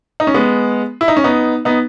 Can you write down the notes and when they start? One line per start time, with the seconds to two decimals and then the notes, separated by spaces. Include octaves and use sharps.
0.20 D#4
0.27 C#4
0.34 G#3 B3
1.01 E4
1.08 D#4
1.17 C#4
1.24 B3 D#4
1.65 B3 D#4